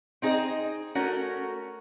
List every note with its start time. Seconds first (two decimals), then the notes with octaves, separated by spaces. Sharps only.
0.22 C4 D#4 G#4 C5 D#5
0.95 A3 C#4 F#4 A#4